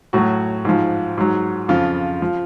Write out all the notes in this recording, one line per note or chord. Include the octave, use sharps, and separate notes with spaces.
A2 F#3 F#4
G#2 F3
G#2 F#3
F2 C#3 F3 F4
F3